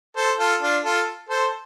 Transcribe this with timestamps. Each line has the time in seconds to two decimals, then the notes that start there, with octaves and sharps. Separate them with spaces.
0.16 A4 C5
0.39 F4 A4
0.61 D4 F4
0.84 F4 A4
1.29 A4 C5